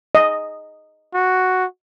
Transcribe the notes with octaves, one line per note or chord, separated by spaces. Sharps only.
D#5
F#4